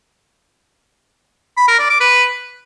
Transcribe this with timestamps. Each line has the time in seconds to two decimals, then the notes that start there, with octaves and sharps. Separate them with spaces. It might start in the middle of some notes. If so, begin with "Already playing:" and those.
1.57 B5
1.68 A#4
1.79 D5
1.90 D6
2.01 B4